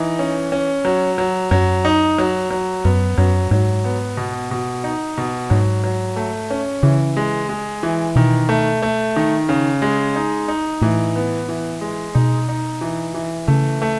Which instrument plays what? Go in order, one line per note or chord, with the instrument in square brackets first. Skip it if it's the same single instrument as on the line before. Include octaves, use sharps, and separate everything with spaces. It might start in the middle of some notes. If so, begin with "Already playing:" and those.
Already playing: [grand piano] E3 D#4
C#4
C#4
F#3
F#3
[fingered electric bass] F#2 [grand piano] F#3
[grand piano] D#4
F#3
F#3
[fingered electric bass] F#2 [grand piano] B3
[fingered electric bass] F#2 [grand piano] F#3
[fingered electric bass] G#2 [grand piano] F#3
[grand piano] B3
B2
B2
D#4
B2
[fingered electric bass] G#2 [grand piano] F#3
[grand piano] F#3
A3
C#4
[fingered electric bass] C#3 [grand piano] E3
[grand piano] G#3
G#3
E3
[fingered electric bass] B2 [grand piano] D#3
[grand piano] A3
A3
D#3
C#3
G#3
D#4
D#4
[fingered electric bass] A2 [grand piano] E3
[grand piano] B3
E3
G#3
[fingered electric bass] B2 [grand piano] D#4
[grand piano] D#4
E3
E3
[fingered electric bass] C#3 [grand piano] A3
[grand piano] A3